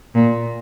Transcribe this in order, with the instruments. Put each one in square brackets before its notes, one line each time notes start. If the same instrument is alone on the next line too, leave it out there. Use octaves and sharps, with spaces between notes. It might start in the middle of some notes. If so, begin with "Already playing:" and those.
[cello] A#2